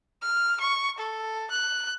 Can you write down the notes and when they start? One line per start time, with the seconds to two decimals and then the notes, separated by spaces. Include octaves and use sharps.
0.22 F6
0.61 C#6
0.98 A4
1.51 F#6